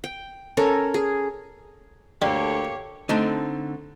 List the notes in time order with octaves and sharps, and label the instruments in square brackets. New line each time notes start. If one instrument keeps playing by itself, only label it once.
[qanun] G5
C#4 A4 A#4
G#4
[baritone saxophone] D2 [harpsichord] G3 [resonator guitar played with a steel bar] A#3 A4 [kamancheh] G4 C#5
[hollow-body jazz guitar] D3 A3 C4 D#4